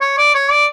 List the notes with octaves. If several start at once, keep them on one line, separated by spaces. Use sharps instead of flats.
C#5
D5
C#5
D5